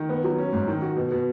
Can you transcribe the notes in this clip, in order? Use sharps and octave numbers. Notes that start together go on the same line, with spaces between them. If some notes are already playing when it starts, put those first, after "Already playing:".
Already playing: D#3
B3
F#3
C#4
G#2
D#3
F#4
B2
B2